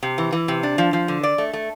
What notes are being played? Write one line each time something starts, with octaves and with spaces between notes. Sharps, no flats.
C3
E3
E3
C3
D4
F3
F3
D3
D5
A3
A3